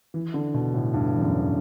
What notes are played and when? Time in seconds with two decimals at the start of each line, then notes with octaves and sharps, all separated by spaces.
0.14 E3
0.34 D3
0.54 B2
0.74 A2
0.94 G2
1.16 E2
1.21 F#2